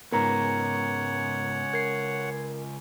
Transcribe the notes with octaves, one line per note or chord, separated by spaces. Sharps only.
C#2 G#2 B3 A#4 C#5 F#5 A#5
A#4 G#6 C7